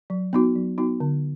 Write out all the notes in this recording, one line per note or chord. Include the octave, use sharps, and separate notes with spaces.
F#3
B3 D#4 F#4
F#3
B3 D#4 F#4
D3